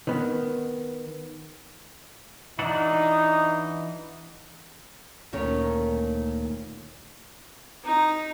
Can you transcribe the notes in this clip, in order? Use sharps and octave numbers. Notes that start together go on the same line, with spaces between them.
D#3 B3
E3 D4 D#4 F#4
D2 A#2 D#3 C#4 C#5
D#4